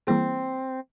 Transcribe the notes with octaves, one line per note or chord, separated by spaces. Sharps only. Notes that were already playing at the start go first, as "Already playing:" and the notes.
E3 G3 A#3 C4 E4 G#4